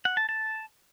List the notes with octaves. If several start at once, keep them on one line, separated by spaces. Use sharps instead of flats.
F#5
A5
A5